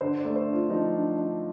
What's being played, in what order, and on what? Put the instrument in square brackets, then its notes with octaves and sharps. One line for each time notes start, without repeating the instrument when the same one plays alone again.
[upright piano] D3 [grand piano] C5
[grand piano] D5
[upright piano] A3
[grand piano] C5
[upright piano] D4
[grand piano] F4
[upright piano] F3 [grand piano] D#4
[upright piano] D4
D4